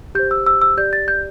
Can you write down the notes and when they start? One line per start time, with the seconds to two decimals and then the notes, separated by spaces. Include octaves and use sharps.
0.15 G4 C5 G6
0.31 E6
0.46 E6
0.62 E6
0.77 G4 D5 G6
0.93 A6
1.08 G6